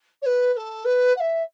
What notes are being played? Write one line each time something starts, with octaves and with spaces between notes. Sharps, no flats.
C#5
B4
B4
A4
B4
F#5
E5